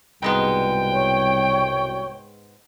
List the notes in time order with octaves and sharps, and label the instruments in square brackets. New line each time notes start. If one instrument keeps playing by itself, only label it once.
[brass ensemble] C2 B2 G3 [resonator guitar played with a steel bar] G#2 G#3 B3 [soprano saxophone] G5
[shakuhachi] C#5